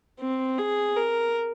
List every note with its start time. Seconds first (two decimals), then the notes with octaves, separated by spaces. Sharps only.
0.20 C4
0.58 G#4
0.97 A#4